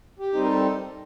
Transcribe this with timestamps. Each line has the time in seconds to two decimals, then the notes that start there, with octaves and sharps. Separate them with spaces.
0.19 G4
0.33 G3 C4 D#4
0.43 A#4
0.47 A4